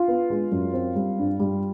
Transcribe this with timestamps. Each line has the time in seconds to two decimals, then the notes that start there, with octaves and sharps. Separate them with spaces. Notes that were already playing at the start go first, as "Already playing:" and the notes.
Already playing: F4
0.08 B3
0.30 G#3
0.52 F#2
0.73 C4
0.95 G3
1.18 G2
1.40 G3